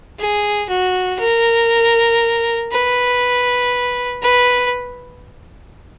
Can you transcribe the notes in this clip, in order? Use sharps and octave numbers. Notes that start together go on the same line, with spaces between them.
G#4
F#4
A#4
B4
B4